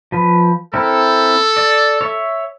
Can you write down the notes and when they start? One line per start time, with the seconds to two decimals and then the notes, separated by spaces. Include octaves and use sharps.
0.12 F3 B4
0.74 C4 E4 A4 A#4
1.57 D5
2.01 C#5 E5